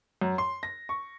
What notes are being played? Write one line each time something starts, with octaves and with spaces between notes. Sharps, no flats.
F#2
C6
A#6
C#6